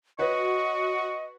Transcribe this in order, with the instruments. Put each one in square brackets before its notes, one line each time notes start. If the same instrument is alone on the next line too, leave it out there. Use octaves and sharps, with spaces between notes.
[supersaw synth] F#4 [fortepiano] B4 C#5 [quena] D#5 [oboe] C#6